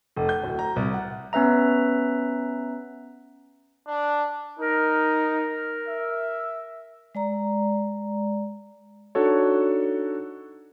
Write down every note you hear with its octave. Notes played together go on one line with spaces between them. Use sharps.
F1
G6
D1
A#5
C2
F#5
B3 C#4 B4 E5 A#5
D4
D#4 A#4
E5
G#3 D5 A#5
D4 D#4 F#4 A4 C#5